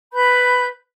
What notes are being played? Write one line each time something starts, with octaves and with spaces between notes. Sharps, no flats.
B4 B5 G6